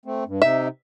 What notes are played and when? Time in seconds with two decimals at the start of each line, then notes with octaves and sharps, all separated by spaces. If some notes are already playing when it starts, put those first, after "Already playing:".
0.06 A3 C4
0.27 G2
0.42 C3 D#4 E5